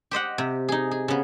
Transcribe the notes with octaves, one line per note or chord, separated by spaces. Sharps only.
G4 C5 D#5 F#5
C3
D#4 G#4
G#4
C#3 B3